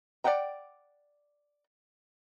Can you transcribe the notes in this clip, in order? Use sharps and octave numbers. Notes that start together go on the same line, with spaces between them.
D5 E5 F#5 G5 A#5